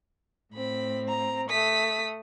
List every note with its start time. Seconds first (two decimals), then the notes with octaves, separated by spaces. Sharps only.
0.55 A2 C4 B5
1.09 A#5
1.50 A3 D#6 B6